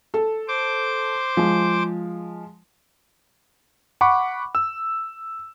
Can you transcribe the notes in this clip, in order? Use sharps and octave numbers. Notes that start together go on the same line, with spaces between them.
A4
C5 D6
F3 G#3
F#5 B5 C#6 D6
E6